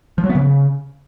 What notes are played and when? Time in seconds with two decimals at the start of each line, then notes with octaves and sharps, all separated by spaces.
0.18 F3
0.24 F#3
0.29 B3
0.35 C#3